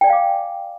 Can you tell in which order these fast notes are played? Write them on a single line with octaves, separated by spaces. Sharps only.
G5 D5 G#5 F5 D6